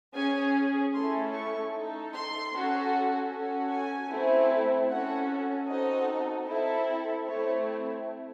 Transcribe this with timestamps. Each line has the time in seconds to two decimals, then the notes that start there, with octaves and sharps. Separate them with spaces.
0.15 C#4 G#4 G#5
0.94 A3 C#4 E4 A4 C6
1.34 C#6
1.73 D#4 A4
2.13 C6
2.53 C#4 F#4 A4
3.31 C#4 F#4 A4
3.71 G#5
4.11 A3 C4 E4
4.90 C#4 F#4 A4 F#5
5.68 C4 D#4 F#4 A4 D#5
6.47 C4 E4 A4
7.27 A3 C4 E4 C#5